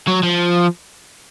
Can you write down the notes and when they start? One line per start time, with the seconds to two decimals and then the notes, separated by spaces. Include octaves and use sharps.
0.08 F#3
0.23 F3